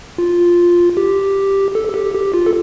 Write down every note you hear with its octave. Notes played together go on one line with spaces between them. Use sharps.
F4
G4
A4
A4
G4
G4
F4
A4